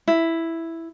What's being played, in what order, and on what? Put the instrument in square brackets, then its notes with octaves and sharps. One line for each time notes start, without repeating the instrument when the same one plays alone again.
[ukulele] E4